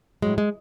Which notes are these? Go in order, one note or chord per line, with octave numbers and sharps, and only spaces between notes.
A2 F#3 G#3
G#3